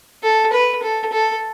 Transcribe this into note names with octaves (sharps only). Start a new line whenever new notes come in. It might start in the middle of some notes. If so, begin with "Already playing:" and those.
A4
B4
A4
A4